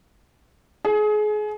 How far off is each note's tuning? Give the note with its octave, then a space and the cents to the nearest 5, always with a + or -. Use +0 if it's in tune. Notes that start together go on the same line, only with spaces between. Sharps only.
G#4 +30